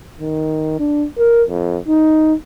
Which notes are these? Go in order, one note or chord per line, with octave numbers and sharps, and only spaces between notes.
D#3
D4
A#4
F2
D#4